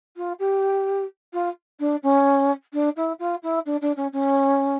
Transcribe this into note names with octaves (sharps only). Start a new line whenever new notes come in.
F4
G4
F4
D4
C#4
D4
E4
F4
E4
D4
D4
C#4
C#4